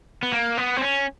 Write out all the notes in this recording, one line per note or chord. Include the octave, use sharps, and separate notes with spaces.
B3
A#3
B3
C4
C#4